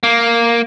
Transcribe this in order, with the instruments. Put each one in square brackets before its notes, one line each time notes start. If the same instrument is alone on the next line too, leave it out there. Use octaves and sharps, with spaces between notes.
[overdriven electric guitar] A#3